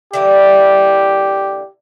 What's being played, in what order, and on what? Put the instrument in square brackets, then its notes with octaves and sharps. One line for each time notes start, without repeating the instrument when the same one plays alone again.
[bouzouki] D3 E3 A#3 [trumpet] G4